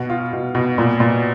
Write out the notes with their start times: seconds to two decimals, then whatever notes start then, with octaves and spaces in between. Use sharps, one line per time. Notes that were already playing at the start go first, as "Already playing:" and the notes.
Already playing: B2 F#4
0.10 F4
0.33 B2
0.55 B2
0.78 A#2
1.00 A#2